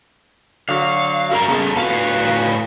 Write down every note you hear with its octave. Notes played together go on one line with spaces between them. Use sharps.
D3 F#3 F5
F#4 A#4 F5 A#5
C#3 B3 A4
A2 B3 F4 F#4 F5